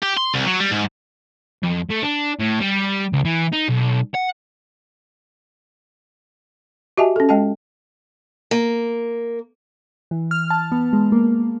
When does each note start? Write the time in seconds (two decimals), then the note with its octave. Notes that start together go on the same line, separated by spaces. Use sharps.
0.03 G4
0.17 C6
0.34 C2
0.46 F#3
0.60 G3
0.71 G#2
1.63 F2
1.91 A3
2.03 D4
2.39 A2
2.60 G3
3.13 C#2
3.25 E3
3.53 D#4
3.69 B1
4.15 F#5
6.97 F#4 G4 D#5 E5 G#5 A5
7.16 C#4 A4
7.29 G#3 D#5 G5 A5
8.51 A#3
10.11 E3
10.31 F6
10.50 A5
10.72 B3
10.93 G#3
11.12 A#3